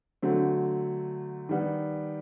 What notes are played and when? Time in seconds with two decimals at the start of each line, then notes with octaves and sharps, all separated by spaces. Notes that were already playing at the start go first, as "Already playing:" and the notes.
0.22 D3 F#3 A3 C4
1.49 D#3 G3 B3